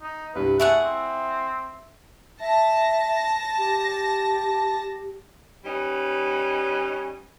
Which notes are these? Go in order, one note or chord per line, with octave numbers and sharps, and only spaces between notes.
D#4
C2 G2 B4
A3 E4 G#4 E5 F#5
C4
E5 A5 A#6
G4
G3 C#4 D#4 B4